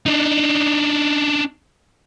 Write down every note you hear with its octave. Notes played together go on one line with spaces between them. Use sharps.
D4 D#4